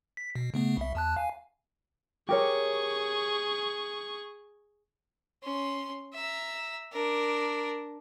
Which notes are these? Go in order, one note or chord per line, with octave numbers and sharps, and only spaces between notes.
B6
B2
C#3 A3 B3
C2 E5
E2 A5 F#6
F5 G#5
G4 G#4 A#4 C#5 C#6
C#4 C6
E5 A#5
D4 A#4